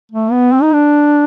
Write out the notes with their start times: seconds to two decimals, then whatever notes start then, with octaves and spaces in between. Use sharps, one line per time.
0.12 A3
0.32 B3
0.53 C4
0.62 D#4
0.73 D4